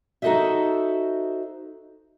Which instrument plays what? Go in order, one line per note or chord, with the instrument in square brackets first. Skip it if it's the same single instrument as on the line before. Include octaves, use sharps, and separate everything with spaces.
[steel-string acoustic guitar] D#4 F#4 A4 C5 D#5 E5